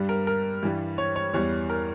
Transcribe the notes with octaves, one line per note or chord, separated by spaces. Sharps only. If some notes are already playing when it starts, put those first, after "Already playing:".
Already playing: G2 G3
A#4
A#4
G2 E3 G3
C#5
C#5
E2 E3 G3 C#5
A#4